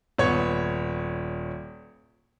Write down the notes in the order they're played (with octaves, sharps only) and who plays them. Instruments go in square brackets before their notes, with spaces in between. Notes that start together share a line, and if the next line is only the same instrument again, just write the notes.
[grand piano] D#1 B3 C#5 G#6 C#7